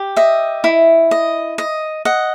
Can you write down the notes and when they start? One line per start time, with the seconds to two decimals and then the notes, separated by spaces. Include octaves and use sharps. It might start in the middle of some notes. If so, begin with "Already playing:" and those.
Already playing: G4
0.16 D#5 E5
0.64 E4
1.11 D#5
1.58 D#5
2.05 D#5 F#5